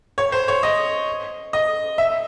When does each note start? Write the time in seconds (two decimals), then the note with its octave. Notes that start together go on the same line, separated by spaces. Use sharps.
0.18 C#5
0.32 C5
0.48 C#5
0.63 D#5
1.53 D#5
1.98 E5